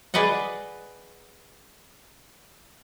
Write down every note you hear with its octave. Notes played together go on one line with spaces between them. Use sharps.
G#4 B4 D5 D#5 F#5